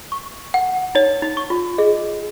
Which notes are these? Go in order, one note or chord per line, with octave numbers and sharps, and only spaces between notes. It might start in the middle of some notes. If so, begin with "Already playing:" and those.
C#6
F#5
D#4 C#5
D#4
C#6
F4
G#4 D#5